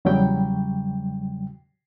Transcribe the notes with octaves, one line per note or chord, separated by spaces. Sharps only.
E2 C#3 F#3 G3 G5